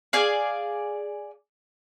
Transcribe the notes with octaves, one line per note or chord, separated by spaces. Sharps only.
G#4 D5 F5